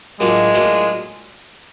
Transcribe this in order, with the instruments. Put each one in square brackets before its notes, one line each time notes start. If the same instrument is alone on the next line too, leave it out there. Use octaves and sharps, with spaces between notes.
[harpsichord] A2 F#3 A#3 D4 F4 [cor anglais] G#3
[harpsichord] A2 F#3 A#3 D4 F4